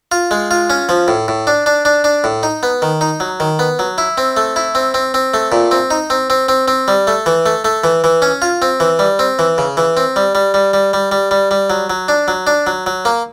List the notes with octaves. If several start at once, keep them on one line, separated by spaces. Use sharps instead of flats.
F4
G#3
F4
C#4
F3
A2
A2
D4
D4
D4
D4
A2
D#4
B3
D#3
D#4
F#3
D#3
B3
F#3
E4
C4
A3
E4
C4
C4
C4
A3
A#2
C4
D#4
C4
C4
C4
C4
G3
A3
E3
A3
A3
E3
E3
C#4
F4
C4
E3
G3
C4
E3
C#3
E3
C4
G3
G3
G3
G3
G3
G3
G3
G3
F#3
F#3
D4
F#3
D4
F#3
F#3
A#3